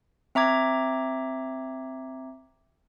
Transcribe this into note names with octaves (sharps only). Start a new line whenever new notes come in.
C4 E5 A#5 D6 G#6